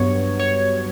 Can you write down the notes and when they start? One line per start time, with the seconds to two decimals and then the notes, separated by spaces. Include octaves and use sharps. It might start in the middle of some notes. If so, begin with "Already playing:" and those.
Already playing: G2 F#3 B3 C#5
0.40 C#5